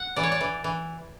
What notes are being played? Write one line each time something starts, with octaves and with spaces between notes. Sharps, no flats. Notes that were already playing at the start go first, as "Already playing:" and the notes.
Already playing: F#5
E3 D5
C#5
D5
E3
E3